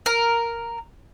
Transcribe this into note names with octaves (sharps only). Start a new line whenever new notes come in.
A#4